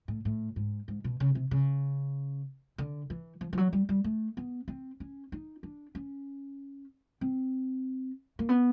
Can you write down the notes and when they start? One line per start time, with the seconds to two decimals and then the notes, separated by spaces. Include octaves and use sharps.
0.08 A2
0.25 A2
0.56 G#2
0.88 G#2
1.04 B2
1.20 C#3
1.35 C3
1.51 C#3
2.78 D3
3.10 E3
3.41 F3
3.53 F3
3.58 F#3
3.73 G3
3.89 G3
4.04 A3
4.37 B3
4.68 C4
5.00 C#4
5.32 D#4
5.63 D4
5.95 C#4
7.21 C4
8.39 A#3
8.49 B3